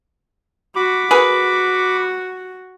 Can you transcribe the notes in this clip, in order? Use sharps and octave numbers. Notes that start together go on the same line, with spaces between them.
F#4 B5 D6
F#4 G#4 A#4 B4